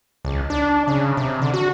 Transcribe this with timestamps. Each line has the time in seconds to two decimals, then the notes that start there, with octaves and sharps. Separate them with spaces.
0.25 C#2
0.50 D4
0.88 C#3
1.17 C3
1.42 D3
1.54 F#4